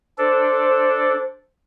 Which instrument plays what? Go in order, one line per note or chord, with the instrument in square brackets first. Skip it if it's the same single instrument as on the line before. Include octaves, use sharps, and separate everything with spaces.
[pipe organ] D4 A4 [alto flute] C5